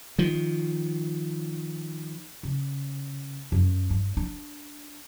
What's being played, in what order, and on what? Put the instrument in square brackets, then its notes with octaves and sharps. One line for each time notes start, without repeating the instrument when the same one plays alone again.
[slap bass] D#3 F3
[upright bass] C#3
F#2
G2
D4